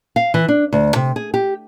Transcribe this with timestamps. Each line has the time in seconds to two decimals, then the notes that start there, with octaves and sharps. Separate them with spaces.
0.16 F5
0.34 E3
0.48 D4
0.73 D2
0.96 C3
1.16 G#4
1.34 G4